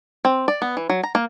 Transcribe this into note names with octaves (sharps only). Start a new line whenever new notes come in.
C4
D5
B3
E3
F#3
A#5
A#3